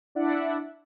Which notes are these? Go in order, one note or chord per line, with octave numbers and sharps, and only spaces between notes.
D4 E4 D5 E5 F#5